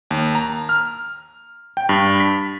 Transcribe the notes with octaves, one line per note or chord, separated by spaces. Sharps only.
D#2
A#5
F6
G5
G2
B6